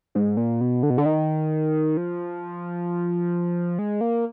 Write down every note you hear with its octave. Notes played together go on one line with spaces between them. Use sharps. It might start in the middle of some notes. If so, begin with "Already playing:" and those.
G#2
A#2
B2
D3
B2
D3
D#3
F3
G#3
A#3